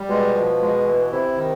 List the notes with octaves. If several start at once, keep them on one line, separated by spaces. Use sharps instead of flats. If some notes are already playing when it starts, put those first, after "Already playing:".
Already playing: G3
B2 G#3
F3
G#3
E3
C3 E4
D#3